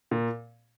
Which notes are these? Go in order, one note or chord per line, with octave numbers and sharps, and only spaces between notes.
A#2